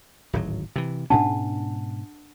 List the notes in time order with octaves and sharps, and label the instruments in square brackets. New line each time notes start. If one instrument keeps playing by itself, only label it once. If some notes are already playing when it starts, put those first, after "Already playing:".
[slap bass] D1 G#1 F#3
C3 E3
[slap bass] G#2 B2 C#4 [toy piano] D4 F#5 A5